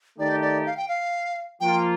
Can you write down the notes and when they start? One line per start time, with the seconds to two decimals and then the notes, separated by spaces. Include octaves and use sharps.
0.19 D#3 A3 D#4 G4 D5
0.42 D5
0.66 F5
0.77 G5
0.88 F5
1.61 F3 A#3 F4 G5